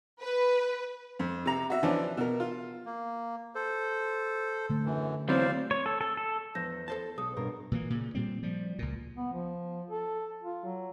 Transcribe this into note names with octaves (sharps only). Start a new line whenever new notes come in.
B4
F2
C3 A#5
F#4 E5
E3 F3 C#4 D4
B2 A#4
F4
A#3
A4 C5
D3 A3
F#2 E3
E2 F#3 C4 C5 D5 F5
C#5
A4
A4
A4
E2 F3 G6 A#6
A4 C5 A5
B1 A4 D#6
G2 B2 A#4
A#2 E3 A#3
A#2 C#3
A#2 G3 C4
F3 G3
C#2 A#2
B3
F3
A4
F4
F#3